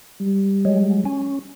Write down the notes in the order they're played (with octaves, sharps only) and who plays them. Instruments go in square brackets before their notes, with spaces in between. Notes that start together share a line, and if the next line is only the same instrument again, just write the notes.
[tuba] G3
[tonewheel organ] F#3 G#3
C#4